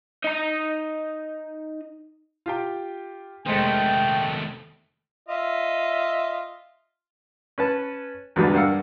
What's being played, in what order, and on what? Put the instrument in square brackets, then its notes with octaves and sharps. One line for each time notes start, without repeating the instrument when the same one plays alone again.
[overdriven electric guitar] D#4 A#5
[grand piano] F4 G4 G5
[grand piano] F1 G#3 C5 [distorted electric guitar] D#3 A3 [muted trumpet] G5
[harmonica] F4 D#5 E5
[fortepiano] C#4 B4 A5
E2 G#2 D3 F#3 G3 B3
G2 G3 A#4 F5 F#5 E6